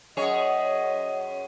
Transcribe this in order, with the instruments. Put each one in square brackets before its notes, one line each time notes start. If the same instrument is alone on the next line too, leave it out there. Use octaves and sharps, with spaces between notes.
[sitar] F#2 G#4 C#5 [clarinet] D#5